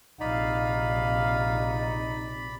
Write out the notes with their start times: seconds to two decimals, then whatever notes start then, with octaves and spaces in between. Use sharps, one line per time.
0.21 A#1 C3 D#4 D5 F5 B5